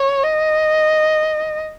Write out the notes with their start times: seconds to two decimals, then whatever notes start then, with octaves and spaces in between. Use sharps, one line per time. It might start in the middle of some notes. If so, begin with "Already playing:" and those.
Already playing: C#5
0.24 D#5